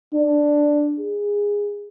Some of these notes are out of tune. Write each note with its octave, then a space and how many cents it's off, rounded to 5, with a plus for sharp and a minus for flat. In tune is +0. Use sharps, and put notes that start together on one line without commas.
D4 +5
G#4 -15